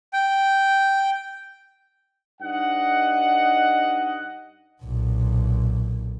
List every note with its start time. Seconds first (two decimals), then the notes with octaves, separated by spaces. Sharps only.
0.13 G5
2.42 G2 D#4 D#5 F#5
4.82 B1 A#2